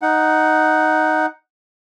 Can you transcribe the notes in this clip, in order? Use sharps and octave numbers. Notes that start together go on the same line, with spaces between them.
D#4 F#5